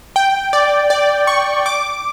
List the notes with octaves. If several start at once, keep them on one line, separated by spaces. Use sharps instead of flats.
G5
D5
D5
C#6
D6